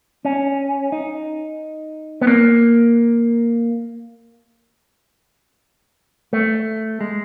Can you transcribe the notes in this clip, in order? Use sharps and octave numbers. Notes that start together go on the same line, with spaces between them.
C#4
D#4
B3
A#3
A3
G#3